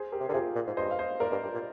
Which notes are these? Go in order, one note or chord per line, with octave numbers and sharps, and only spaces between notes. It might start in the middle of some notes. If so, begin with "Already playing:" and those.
Already playing: G#4 C5
G4 A#4
C3
D3 A#4
C3 F4 G#4
A#2
G#2
G2 C5 D#5
F5
C5 D#5
G#2 A#4 D5
G2
G2
A#2